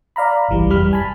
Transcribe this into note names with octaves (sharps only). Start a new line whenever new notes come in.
D5 F5 A#5 B5
G1 C2 E3 G3
F2 G3 B5 F6
G#5 A5 B5